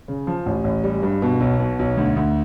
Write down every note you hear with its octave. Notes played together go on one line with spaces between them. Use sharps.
C#3
F3
A1
A1
G3
G2
B2
B1
B2
B1
D2
D2